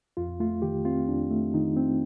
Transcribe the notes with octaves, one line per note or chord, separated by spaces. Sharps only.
F2 F4
A3 F4
D#3 G4
C4 F4
F2 D4
A3
D#3 D#4
C4